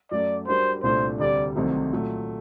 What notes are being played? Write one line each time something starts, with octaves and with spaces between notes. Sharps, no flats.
F#2 F#3 A3 D5
G3 D4 F#4 A#4 C5 D5
C2 A#2 A3 D4 C5
D2 C3 G3 D5
C2 C3 D#3 F#3 A3
A#2 F#3 A3